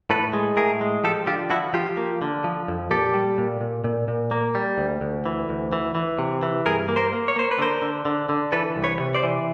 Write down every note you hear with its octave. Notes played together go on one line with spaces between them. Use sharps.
A2 A4 B4
G#3
A2 G#4 A#4
G#3
F3 G4 A4
D3 F4 G4
F3 E4 F#4
F3 F4 G4
A#3
D3
F3
F2
A#2 G4 A4
G3
A#2
A#2
A#2
A#2
A#3
G3
D2
D2
E3
D2
E3
E3
C3
E3
G2 G#4 A#4
A#3
A#4 C5
A#3
C#5
A#3 C5
B4
D3 A#4 C5
D3
D3
D3
E3 A4 B4
C2
B4 C#5
C3
C5 D5
E3